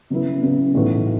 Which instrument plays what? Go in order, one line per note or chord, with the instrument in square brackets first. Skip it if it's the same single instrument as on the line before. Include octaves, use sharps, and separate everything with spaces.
[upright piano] C#3 F#3 B3 E4
C#3 F#3 B3 E4
B1 A2 E3 B3 F#4